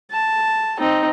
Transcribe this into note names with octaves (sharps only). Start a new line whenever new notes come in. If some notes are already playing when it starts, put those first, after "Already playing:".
A5
C4 D#4